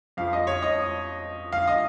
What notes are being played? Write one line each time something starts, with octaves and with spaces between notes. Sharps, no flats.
F2 F3 F5
D#5
C#5
D#5
F5
D#5